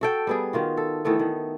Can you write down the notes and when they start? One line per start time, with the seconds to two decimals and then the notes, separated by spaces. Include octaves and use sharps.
0.01 F#4 A4 G5
0.27 G3 B3 G#4
0.53 D#3 F4 F#4
0.77 A4
1.05 D#3 E3 A3 B3
1.19 D#3